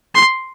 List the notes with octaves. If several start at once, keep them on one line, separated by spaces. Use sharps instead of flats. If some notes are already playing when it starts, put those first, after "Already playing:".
C6